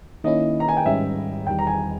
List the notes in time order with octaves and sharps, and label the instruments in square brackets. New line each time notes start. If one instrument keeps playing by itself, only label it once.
[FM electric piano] D#3 A#3 C#4 E4 [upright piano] D#5
[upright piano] A#5
G#5
G5
[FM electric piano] G#2 D#3 G3 C#4 [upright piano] E5
[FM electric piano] E2 D#3 G3 [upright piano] G5
[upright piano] A#5
G#5